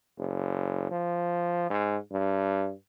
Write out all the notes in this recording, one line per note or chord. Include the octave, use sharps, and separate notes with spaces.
F#1
F3
G#2
G2